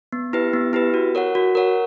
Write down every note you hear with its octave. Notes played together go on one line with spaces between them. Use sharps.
B3
E4 G4 B4
B3
E4 G4 B4
F#4
A#4 C#5 F#5
F#4
A#4 C#5 F#5